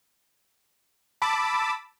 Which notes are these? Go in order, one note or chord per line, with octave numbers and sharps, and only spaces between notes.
A5 B5 D6 E6